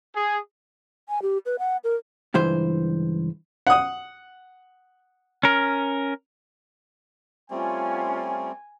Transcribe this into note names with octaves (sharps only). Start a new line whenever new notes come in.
G#4
G#5
G4
B4
F#5
A#4
C#2 G2 E3 C5
F#5 D#6
C#4 A#4
G3 A3 C4 C#4 F4 G#5